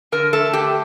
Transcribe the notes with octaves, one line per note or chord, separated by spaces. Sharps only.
D3 A#4
A3 A4
D3 G4